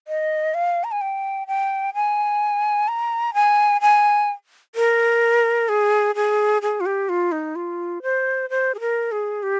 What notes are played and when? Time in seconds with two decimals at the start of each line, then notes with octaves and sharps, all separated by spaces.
0.08 D#5
0.54 F5
0.84 A#5
0.91 G#5
1.01 G5
1.47 G5
1.94 G#5
2.88 A#5
3.34 G#5
3.81 G#5
4.75 A#4
5.69 G#4
6.15 G#4
6.62 G#4
6.80 F4
6.86 G4
7.09 F4
7.32 D#4
7.56 F4
8.02 C5
8.50 C5
8.75 G#4
8.80 A#4
9.12 G#4
9.43 G4